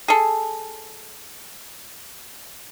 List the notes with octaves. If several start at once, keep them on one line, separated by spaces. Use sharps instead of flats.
G#4 A4